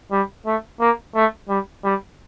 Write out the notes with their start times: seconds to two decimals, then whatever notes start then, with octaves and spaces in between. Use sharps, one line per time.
0.11 G3
0.46 A3
0.80 A#3
1.15 A3
1.48 G3
1.83 G3